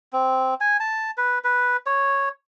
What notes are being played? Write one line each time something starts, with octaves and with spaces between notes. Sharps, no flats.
C4
G#5
A5
B4
B4
C#5